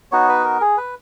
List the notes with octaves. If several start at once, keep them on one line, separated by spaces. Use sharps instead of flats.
B3 D#4 F#4 C#5
B4
A#4
G#4
B4